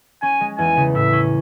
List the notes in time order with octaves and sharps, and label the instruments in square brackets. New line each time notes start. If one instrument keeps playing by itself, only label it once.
[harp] C#4 [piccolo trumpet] G#5
[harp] G#3
[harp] E2 [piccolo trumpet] G#5
[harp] C#3
[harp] A2 [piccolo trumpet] E5
[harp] C#4